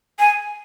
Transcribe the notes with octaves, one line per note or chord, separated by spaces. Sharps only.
G#5